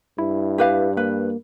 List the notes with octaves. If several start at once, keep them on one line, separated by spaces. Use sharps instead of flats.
G2 E4
G4 B4 F5
A#3 B4